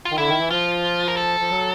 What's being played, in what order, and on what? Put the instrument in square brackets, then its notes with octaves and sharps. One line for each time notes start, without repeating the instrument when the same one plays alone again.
[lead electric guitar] F4
[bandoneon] D#3
[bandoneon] D3 [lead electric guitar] E4
[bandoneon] D#3
E3
[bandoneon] F3 [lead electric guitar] F4
[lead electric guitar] A#4
A4
[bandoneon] F3
F#3